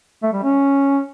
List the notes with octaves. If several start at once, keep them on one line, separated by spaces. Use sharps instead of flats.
A3
G3
C#4